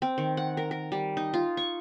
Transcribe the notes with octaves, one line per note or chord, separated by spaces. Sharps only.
C4
D#3
F#5
A#4
A#4
G3
D#4
F4
C#6